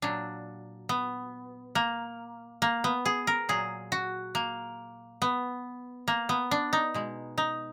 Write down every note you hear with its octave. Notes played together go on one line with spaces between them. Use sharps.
A#2 F#3 D4
B3
A#3
A#3
B3
G#4
A#4
A#2 F#3 G#4
F#4
A#3
B3
A#3
B3
D4
D#4
B2 G#3
D#4